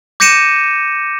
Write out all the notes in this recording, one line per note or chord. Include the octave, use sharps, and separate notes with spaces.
D6 G6 A#6 C#7 D#7 E7